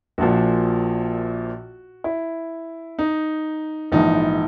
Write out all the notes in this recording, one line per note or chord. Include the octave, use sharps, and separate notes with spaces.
A#1 A#2 F3 F#4
E4
D#4
A#1 G#2 E3 D#4